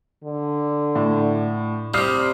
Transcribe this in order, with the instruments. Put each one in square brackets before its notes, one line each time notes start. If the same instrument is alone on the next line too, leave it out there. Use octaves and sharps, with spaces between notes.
[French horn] D3
[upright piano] A2
[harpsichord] C3 G3 [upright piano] D#6 F6 C7